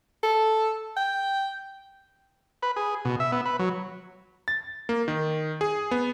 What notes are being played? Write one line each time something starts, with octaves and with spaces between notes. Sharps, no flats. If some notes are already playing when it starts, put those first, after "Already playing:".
A4
G5
B4
G#4
B2
E5
B3
B4
F#3
A6
A#3
D#3
G#4
B3